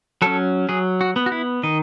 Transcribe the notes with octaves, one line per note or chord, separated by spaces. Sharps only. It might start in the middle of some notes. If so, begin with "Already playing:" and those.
F#3 C#4 A4
F#3 G#4
F#4
B3
F#4
E4
D#3 D#5